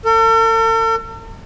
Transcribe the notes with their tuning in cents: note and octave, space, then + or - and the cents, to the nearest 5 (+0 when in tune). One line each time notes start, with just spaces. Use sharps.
A4 +45